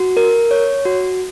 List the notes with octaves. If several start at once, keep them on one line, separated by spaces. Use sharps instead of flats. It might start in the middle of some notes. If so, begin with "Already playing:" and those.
Already playing: F#4
A#4
C#5
F#4